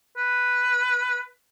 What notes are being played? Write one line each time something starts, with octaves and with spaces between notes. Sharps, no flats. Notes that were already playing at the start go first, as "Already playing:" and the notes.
B4